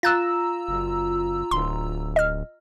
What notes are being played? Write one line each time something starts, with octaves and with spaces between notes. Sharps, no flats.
F4 A#5 E6 F#6 A6
F#1
D1 C6
D#5 F6